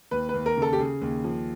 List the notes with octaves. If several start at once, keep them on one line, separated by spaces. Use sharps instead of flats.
D#2 B4
B4
D#2
A#4
C#3 A4
G4
C#3 G#4
D#2
F3